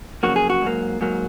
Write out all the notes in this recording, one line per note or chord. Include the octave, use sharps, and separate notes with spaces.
F2 C#3 F#3 A#3 F#4
G#4
F#4
G#2 F#3 A#3
G#2 F#3 A#3